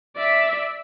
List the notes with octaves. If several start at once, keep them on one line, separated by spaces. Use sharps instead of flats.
D5 E5